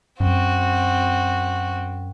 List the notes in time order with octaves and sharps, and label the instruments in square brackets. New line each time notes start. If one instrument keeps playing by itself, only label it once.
[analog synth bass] F#2 [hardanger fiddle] C4 F#4